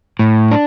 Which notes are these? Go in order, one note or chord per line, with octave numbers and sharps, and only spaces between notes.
A2
D4